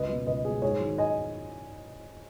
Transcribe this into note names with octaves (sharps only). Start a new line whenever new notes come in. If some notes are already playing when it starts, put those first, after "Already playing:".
Already playing: C#2 B4 D#5
B2 F#3
C#2 B4 D#5
B2 F#3 G#4
G#2 G#4 C#5
D#3 F#3
D#5 G#5